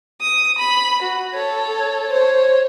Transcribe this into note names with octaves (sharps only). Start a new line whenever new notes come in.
D#6
B5
F#4
A4 C#5
C5 C#5